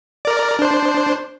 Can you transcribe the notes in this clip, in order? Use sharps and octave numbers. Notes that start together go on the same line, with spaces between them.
A#4 D5
D4 C5